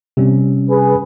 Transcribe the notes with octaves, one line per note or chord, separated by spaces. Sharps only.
C3 G3 C#4
G#4 B4